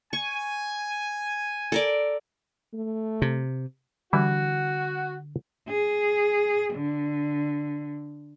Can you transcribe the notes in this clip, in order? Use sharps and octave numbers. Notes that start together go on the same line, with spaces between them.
G#5 C#6
A4 A#4 D5
A3
C3
D3 E3 G3 E4 F#4
G#4
D3